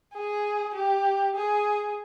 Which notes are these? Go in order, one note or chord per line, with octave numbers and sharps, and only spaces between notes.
G#4
G4
G#4